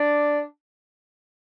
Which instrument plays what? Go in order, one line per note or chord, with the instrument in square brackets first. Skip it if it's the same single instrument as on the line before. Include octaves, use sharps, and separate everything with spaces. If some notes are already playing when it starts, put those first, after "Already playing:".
Already playing: [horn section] D4 D5